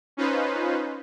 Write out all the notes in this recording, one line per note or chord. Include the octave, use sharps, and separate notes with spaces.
C#4 D#4 F4 B4 C5